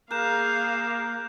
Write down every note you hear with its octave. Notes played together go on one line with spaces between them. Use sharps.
A#3 G#4 A#4 F5 F#6 G6 E7